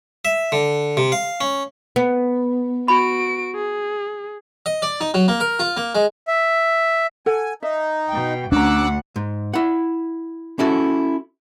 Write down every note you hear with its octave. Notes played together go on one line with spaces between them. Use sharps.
E5
D3
C3
F5
C#4
B3
F#4 B5 D7
G#4
D#5
D5
D#4
F#3
A#3
A#4
F4
A#3
G#3
E5
A4 F#5 G#5
D#4 E5
B2 G5
D2 C#4 D4 F#5 A#5 D6 E6 F#6
G#2
E4 F#5
C#4 E4 F#4 A4